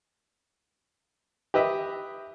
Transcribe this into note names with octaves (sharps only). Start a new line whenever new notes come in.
G4 B4 D#5 E5